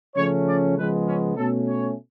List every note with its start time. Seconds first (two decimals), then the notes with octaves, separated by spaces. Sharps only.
0.15 C#3 F3 A3 C#4 C#5
0.46 D5
0.76 C#3 F3 G#3 B3 B4
1.06 C#4
1.36 B2 A3 C#4 A4
1.67 C#5